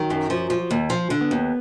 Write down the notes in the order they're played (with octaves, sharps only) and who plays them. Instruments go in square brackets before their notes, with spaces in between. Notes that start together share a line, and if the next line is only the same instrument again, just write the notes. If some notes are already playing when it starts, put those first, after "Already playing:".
Already playing: [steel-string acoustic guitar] D#3 [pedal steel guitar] F#3
[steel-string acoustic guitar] F#2
F3
F3
D#2
F3
D3
[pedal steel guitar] B3
[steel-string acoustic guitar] D#2